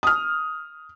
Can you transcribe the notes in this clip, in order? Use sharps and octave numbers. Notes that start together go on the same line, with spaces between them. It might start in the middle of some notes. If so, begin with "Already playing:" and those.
D#6 F6